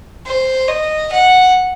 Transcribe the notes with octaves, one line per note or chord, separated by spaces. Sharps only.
C5
D#5
F#5